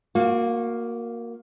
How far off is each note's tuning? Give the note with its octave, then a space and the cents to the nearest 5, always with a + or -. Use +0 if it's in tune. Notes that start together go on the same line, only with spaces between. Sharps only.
A#3 +0 F#4 -30